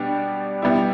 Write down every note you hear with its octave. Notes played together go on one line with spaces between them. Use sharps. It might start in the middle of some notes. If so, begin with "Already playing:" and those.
Already playing: B2 G3 B3 D4
B2 G3 B3 E4